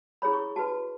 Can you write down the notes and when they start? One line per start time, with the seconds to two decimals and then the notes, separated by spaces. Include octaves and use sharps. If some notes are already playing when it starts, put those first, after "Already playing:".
0.22 E4 G#4 C#5 B5
0.33 C#6
0.56 F#4 B4 A5